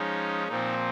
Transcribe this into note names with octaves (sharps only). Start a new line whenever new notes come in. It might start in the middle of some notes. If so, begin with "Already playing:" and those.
Already playing: F3 G#3 C#4 D#4
A#2 F3 C4 D#4